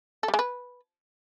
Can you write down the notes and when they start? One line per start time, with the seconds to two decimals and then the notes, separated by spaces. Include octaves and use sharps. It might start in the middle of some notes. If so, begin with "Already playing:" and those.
0.23 A4
0.28 G3
0.34 G#3
0.39 B4